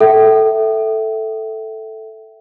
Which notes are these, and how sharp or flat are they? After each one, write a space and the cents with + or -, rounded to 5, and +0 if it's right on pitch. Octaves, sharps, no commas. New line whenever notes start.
A4 +0 E5 +0 G5 -40